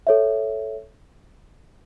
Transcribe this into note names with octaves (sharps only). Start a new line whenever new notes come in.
A4 C#5 E5